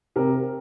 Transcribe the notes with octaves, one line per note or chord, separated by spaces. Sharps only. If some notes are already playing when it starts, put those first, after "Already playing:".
C3 A#4